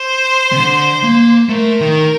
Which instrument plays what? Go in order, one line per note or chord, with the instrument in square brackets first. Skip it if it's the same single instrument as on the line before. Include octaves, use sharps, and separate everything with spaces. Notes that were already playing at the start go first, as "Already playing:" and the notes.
Already playing: [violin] C5
[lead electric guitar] C3
D3
A#3
[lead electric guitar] A3 [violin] A#4
[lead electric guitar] D#3